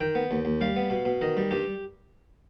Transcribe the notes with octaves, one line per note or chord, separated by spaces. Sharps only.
D#3 G5
B3
D#2
D#2
G3 F5
B3
B2
B2
D#3 D#5
G3
G2 G4